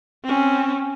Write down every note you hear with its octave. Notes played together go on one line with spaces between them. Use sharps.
C4 C#4